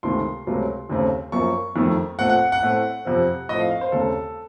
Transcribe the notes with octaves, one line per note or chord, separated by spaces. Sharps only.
C#2 C3 D#3 A3 C6
C#2 C3 F#3 A3
D#2 C#3 A3 C4
F#2 F3 A#3 C#6
F2 D#3 A3
A#2 A3 C4 F#5
F#5
F#5
A2 A3 C4
F2 C3 F3 C4
A2 F3 A3 C4 D#5
F5
F5
C5
D#2 C#3 A3 C4 A4